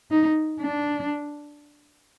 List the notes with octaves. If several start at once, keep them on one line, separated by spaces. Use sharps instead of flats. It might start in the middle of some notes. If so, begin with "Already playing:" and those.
D#4
D4